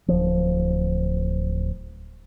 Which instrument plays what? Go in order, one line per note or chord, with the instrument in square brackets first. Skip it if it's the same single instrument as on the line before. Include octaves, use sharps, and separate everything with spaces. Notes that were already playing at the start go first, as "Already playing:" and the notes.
[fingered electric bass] D1 F3